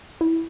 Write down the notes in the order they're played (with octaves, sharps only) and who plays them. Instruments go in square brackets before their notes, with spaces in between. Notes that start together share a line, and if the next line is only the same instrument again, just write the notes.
[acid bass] E4